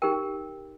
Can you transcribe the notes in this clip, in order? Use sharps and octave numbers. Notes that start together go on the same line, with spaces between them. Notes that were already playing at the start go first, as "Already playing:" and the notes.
D#4 G4 A#4 G5